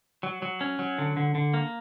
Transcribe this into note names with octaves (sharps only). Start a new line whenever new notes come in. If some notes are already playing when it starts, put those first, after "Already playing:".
F#3
F#3
C#4
F#3
D3
D3
D3
A#3